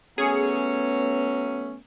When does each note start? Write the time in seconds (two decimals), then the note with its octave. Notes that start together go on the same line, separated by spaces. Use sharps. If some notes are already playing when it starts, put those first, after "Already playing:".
0.18 F#3 A3 B3 C#4 G#4 C#7